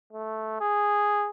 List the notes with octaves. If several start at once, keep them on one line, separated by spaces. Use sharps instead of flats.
A3
G#4